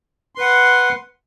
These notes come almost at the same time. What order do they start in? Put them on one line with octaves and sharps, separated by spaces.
C6 B4 F#5